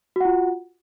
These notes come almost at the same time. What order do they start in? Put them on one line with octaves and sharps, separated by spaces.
F#4 F#5 F4